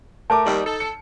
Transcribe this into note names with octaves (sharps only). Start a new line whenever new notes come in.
A3 A#4 A5 D6
D#2 G3 D#4
A4
C#7